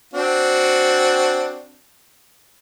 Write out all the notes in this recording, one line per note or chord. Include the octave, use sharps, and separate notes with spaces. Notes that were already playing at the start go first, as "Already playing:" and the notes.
C4 D4 F#4